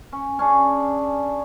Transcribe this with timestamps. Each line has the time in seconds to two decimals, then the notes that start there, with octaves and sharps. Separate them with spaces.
0.12 C#4
0.39 C#4 D4 G#4